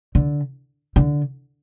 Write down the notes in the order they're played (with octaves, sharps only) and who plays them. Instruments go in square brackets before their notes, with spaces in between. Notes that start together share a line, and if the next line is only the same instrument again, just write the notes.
[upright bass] D3
D3